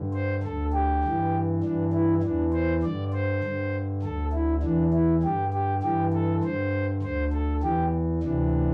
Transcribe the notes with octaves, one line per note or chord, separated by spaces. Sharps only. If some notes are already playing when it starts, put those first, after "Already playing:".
Already playing: G2 D3
C5
D2 D3 A4
G4
G2 E3
G2 E3 D4
E4
E2 E3 D4
C5
G2 D3 D5
C5
G2 D3
D2 D3 A4
E4
E2 E3 D4
E4
G2 D3 G4
G4
G2 E3 G4
A4
G2 D3 C5
D2 D3 C5
A4
E2 E3 G4
D2 C3 E3 D4